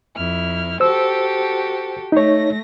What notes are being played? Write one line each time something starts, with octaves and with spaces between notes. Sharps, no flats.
F2 E4 F6
F#4 G4 A4 C5 E6
A3 D#4 C#5 A#6